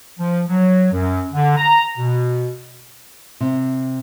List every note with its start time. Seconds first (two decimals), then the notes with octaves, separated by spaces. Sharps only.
0.17 F3
0.48 F#3
0.91 F#2
1.32 D3
1.56 A#5
1.98 B2
3.40 C3